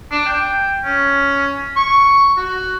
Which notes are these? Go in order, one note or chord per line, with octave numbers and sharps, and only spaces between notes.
D4
G5
C#4
C#6
F#4